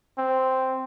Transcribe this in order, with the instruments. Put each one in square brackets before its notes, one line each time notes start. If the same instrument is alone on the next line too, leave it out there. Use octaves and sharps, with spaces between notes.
[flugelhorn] C4